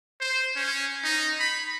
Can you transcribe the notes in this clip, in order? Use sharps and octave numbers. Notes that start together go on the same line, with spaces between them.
C5
C#4
D#4
B5